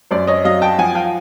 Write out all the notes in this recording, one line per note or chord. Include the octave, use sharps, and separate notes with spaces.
F#2 C5 D5
C#5 D#5
F#3 D#5 F5
G5 A5
F3 F#5 G#5
F5 G5